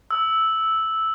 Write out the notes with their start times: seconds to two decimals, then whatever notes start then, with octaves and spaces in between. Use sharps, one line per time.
0.11 E6